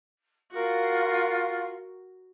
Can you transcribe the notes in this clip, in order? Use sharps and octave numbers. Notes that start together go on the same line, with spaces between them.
F4 F#4 A#4